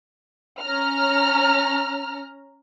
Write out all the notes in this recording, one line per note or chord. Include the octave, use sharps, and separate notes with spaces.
C#4 A#5 F6